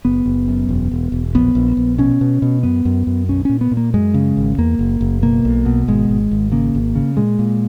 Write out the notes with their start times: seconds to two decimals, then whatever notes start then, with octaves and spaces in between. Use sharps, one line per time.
0.05 F#1 B3
0.26 F#1
0.48 F#2
0.69 E1
0.92 E1
1.12 E1
1.35 A#1 B3
1.55 A#1
1.77 A#1
1.98 B2 C#4
2.21 B2
2.42 B2
2.63 F#2 B3
2.85 F#2
3.07 F#2
3.29 B1 C#4
3.45 A#2 C#4
3.61 B3
3.71 A#2
3.77 A#3
3.94 F#2 G#3
4.14 C#3
4.37 G#1
4.58 E2 A#3
4.79 F#1
5.01 F#1
5.22 B2 A#3
5.45 B1
5.66 B2
5.88 G#1 G#3
6.09 G#1
6.31 G#1
6.52 C#3 A#3
6.75 G#1
6.95 C#3
7.17 A#2 G#3
7.39 A#2